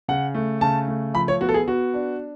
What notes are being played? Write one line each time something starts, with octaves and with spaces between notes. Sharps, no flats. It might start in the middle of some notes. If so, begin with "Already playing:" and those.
C#3 F#5
A3
C#3 A5
A3
F3 B5
C#5
B3 F#4
A4
G#4
B3 F#4
D4